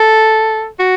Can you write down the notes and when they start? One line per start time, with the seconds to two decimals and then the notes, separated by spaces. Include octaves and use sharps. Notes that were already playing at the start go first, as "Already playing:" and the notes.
Already playing: A4
0.80 F#4